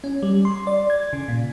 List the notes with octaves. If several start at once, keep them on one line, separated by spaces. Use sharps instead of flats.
C#4
G3
C6
D5
G#6
C#3
A#2